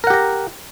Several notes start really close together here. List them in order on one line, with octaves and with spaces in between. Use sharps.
A#4 F#5 G4 A#5